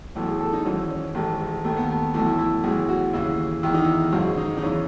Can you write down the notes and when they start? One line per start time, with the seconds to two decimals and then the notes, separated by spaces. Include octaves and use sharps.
0.15 B1 A2 E3 A3
0.28 G#4
0.41 A4
0.53 D#4
0.65 G#1 F#2 E3 C#4
0.90 C#4
1.15 A1 G#2 D#3 A3
1.40 G#3
1.64 D#2 D#3 A3
1.77 B3
1.89 A3
2.14 B1 A2 E3 A3
2.27 E4
2.39 E4
2.64 B1 A2 E3 G#4
2.89 F#4
3.13 D#2 C#3 E3 E4
3.63 E2 D#3 E4
3.74 D#4
3.84 E4
4.12 G#1 F#2 C#3
4.38 D#4
4.57 D#4
4.62 E2 C#3 E3 C#4